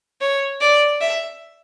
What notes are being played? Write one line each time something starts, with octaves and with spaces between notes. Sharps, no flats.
C#5
D5
E5